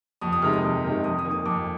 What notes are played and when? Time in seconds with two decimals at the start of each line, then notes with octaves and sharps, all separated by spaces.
0.21 F2 D#6
0.32 D#6
0.42 C3 D#3 G#3 F6
0.53 D#6
0.64 F2
0.84 C3 D#3 G#3
1.04 F2 D#6
1.19 D#6
1.24 D#3 A#3
1.31 D#6
1.46 F2 D6